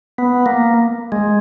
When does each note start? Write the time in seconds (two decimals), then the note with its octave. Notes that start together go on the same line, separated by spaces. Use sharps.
0.18 B3
0.46 A#3
1.12 G#3